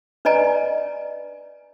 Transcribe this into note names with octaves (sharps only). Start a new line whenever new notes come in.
D4 B4 D5 D#5 G#5 A#5